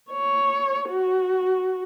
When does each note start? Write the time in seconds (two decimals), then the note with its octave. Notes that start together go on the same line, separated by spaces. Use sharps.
0.11 C#5
0.89 F#4